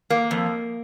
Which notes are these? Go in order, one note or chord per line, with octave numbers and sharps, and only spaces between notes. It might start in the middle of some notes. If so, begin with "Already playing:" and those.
A#3
F2